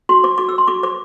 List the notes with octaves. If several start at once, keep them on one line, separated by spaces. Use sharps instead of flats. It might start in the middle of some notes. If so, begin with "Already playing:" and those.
F#4 C6
C5 D6
F#4 D6
E6
C5 C6
F#4 D6
C5 D6